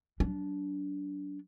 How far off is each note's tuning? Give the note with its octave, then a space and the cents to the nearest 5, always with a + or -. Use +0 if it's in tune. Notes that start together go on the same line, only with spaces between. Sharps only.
F#3 +30 D4 -20